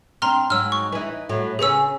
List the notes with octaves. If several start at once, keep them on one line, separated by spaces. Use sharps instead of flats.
C4 D4 A#5 C6 F6
G#2 F#3 E6 F6
C#6
E3 D#4
A2 F#3
C#3 B3 C#4 G#4 E6